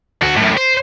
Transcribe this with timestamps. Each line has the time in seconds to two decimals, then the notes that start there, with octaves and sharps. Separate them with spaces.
0.22 D2 F#4
0.36 F#2 A2
0.57 C5